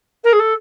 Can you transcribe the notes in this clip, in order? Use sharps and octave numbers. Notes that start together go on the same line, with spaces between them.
A#4
G#4
A4